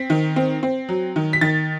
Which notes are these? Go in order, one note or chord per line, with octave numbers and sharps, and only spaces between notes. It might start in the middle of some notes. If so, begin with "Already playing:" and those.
Already playing: C4 B6
D#3
C4
C4
F#3
D#3
B6
D#3 A6